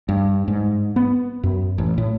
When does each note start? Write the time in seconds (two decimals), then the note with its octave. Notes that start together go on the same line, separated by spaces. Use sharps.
0.09 G2
0.48 G#2
0.96 B3
1.43 F#2
1.78 A1
1.98 A2